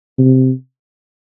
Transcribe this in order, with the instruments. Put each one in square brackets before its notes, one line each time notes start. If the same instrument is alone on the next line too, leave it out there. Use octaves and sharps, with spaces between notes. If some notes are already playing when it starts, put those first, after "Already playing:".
[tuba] C3